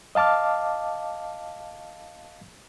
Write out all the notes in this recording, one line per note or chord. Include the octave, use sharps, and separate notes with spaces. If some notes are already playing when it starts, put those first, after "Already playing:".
D#5 F5 A5 D6 F6